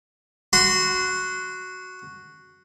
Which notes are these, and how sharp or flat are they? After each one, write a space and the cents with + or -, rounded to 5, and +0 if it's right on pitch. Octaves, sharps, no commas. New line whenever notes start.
F#4 +0 C6 -25